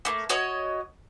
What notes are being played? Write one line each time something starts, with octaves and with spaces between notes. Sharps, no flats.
A3 A#3
F#4 C#5 D#5